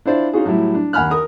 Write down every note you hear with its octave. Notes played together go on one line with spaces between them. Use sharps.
D4 E4 F4 C5 D5
C#4 D#4 F4 F#4 G#4
A2 F#3 G3 E4
D4
D#2 F#5 G#5 B5 F6 F#6
A#4 D#6